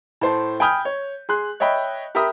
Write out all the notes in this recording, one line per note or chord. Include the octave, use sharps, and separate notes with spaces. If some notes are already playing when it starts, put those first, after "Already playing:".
A2 C5 A5
G5 G#5 B5 D#6 F6 G6
C#5
G#4 C6 F#6
C#5 D#5 E5 G5 B5
G4 A#4 E5 G5 B5 D#6